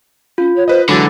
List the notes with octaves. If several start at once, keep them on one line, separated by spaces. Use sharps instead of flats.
C#4 F4
C#5
B4 C5 D#5
D3 E3 F#3 G#3 G#5 B5 D6 A6